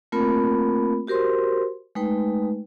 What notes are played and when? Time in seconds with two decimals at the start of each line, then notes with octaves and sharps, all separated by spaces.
0.12 A3 A#3 C4 F4 A#4 B5
1.07 F#4 G4 A#4 C5 C6
1.95 G#3 A3 D#4 B4 G5